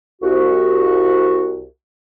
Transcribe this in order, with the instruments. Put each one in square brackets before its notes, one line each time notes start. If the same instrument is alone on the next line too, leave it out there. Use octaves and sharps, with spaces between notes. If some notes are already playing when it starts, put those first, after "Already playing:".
[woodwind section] C2 F#4